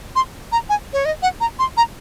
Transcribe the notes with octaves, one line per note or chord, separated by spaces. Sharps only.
C6
A#5
G#5
C#5
D#5
F#5
A#5
C6
A#5